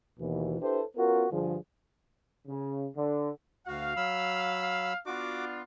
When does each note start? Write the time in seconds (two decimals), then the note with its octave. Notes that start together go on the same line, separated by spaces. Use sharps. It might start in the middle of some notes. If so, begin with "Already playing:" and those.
0.20 D#2 B2 E3
0.61 D4 E4 G4 A4 B4 C5
0.96 B3 C#4 F4 F#4 A#4
1.31 G2 D3 F3 G#4
2.47 C#3
2.96 D3
3.67 D2 F#4 F5
3.97 F#3 B5 E6
5.06 B3 D4 F4 F#4 D6